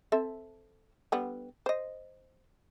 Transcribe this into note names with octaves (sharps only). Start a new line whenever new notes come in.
C4 A4 E5
D3 G3 B3
C5 D#5